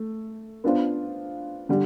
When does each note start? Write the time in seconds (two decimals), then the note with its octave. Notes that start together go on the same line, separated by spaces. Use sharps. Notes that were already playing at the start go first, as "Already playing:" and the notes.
Already playing: A3
0.64 B3 D4 F4 C5
1.69 D3 G3